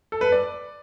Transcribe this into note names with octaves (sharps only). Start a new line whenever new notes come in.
A4
B4
D5